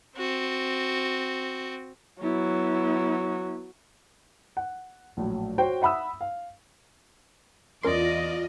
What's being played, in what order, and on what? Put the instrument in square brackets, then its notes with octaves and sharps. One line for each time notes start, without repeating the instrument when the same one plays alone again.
[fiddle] C4 F#4
[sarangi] F#3 [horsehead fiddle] B3 E4
[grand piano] F#5
A#1 A2 F#3
F#4 C5 C#5 G5
E5 F#5 B5 D#6 E6
F5
[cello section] E2 D#5 [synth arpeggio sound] C#4 A#4 C6 [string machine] F4 [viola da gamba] D5